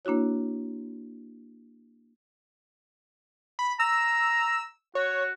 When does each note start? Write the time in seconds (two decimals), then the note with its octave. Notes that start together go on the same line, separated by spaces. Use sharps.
0.05 A#3 D4 E4 F#4 C#5
3.59 B5
3.80 A#5 E6
4.95 F#4 C#5